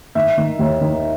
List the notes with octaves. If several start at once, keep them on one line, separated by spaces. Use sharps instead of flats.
D#3 E5
D#3
D#2
D#3